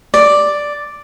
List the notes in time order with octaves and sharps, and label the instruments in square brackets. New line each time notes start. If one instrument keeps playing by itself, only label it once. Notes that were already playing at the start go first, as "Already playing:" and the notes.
[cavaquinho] D5